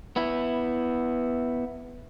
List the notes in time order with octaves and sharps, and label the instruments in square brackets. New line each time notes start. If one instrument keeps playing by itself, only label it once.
[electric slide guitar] B3 E4